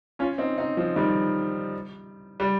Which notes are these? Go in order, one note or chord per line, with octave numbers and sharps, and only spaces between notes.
C#4 F4
C4 D#4
C4 D#4
F3
D#3 G3
G3